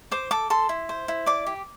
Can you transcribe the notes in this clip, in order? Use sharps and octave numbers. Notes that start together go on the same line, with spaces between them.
C5 D6
A4 D6
A4 C6
E4
C5
E4
D5 D6
G4